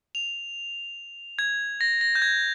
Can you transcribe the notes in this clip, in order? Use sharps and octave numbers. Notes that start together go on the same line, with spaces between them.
F7
G#6
A#6
A#6
G6
G#6